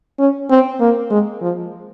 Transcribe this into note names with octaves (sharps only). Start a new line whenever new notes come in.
C#4
C4
A#3
G#3
F3